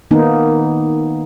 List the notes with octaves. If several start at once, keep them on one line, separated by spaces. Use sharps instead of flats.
D#3 A#3 B3 D#4